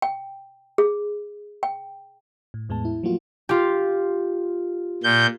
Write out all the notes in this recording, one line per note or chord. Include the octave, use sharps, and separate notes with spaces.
G5
G#4
G5
A2
E2 A2 G#3 B3 A5
E4
F3 F#3 A3 A#3 F4 F#4
F4 G4
A#2 G6